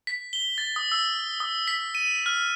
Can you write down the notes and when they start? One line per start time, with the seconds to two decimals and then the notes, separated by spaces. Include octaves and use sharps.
0.07 B6
0.33 G7
0.58 A6
0.76 D#6
0.92 E6
1.40 D#6
1.68 B6
1.95 D#7
2.26 F6